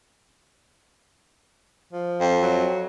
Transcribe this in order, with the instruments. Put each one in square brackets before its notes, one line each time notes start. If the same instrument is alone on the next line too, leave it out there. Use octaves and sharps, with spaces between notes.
[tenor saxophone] F3
[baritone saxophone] F2
[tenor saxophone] F#3